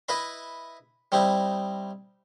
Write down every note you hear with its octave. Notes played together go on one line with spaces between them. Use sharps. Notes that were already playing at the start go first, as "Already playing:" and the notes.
E4 B4 D#5 E5 B5
G3 C4 D#4 E4